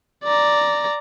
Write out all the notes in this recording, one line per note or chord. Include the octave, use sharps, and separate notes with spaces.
D5 A#5